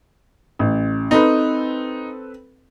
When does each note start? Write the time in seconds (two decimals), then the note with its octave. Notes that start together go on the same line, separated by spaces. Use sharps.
0.59 A1
1.11 C4 D#4 A4 B4